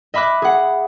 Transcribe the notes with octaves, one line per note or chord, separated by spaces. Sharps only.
D#5 E5 B5 D6 F#6
G#4 F#5